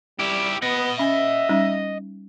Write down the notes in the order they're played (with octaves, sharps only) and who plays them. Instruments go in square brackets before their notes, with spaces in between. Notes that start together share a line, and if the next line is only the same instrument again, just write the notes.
[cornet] G3 [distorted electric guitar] E4 G4
[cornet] B3 [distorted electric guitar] D#5 F#5
[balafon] C#4 G#5 B5 [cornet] E5
[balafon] G3 C#4 D#4